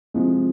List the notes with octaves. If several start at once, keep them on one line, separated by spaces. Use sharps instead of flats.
C3 F3 G#3